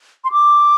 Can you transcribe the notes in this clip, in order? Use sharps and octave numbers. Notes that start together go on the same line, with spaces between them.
C6
D6